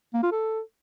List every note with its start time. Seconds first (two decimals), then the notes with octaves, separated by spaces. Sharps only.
0.14 A#3
0.23 F4
0.32 A4